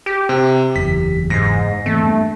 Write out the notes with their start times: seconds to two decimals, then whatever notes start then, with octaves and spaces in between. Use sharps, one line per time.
0.06 G4
0.29 C3
0.76 F#1 E2 E3 B6
1.30 G#2 A#6 C7
1.86 E3 A3 A#3 C4
2.02 G2 B3